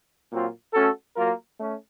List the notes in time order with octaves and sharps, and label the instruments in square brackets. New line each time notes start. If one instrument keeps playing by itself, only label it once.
[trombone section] A#2 F#3 C4 F4
A3 C#4 F#4 A4
F#3 A#3 F4 A#4
A3 C#4